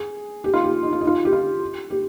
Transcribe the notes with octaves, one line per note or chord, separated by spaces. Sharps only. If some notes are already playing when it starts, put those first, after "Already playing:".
Already playing: G#4
G4
F4
G4
D#4
F4
D#4
F4
G4
F4
G4